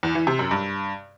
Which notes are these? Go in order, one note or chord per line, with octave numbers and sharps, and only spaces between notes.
E2
E3
C3
F#2
G2